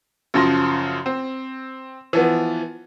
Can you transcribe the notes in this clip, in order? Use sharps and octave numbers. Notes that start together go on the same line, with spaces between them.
F#2 C#3 F3 C6 A#6
C4
E3 F3 B3